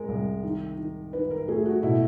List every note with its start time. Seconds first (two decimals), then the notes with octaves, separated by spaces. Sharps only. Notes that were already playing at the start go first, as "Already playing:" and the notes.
Already playing: G#3 A#4
0.08 C2
0.43 D#3
0.78 D#3
1.13 D#3 B4
1.30 A#4
1.48 A3 G#4
1.65 F#4
1.83 B2 E4